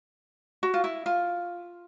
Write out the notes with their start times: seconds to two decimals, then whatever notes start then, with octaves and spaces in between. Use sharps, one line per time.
0.63 F#4
0.74 F4
0.84 E4
1.06 F4